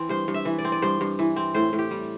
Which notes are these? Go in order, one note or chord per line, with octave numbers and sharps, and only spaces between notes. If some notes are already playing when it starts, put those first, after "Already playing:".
Already playing: E3 C4
G2 C5
G2
E5
E3
D5
C4
D5
G2 C5
G2
E3
C4
A2 C5
A2
G4
G3